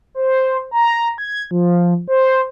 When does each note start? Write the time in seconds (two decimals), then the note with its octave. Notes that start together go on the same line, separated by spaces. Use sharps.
0.15 C5
0.71 A#5
1.18 G#6
1.51 F3
2.08 C5